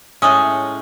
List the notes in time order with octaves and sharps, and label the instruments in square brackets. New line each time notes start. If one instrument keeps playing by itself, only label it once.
[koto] A2 G#3 C#4 [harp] D#6